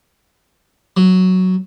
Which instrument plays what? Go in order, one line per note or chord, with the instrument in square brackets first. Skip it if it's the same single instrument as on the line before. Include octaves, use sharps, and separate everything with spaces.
[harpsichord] F#3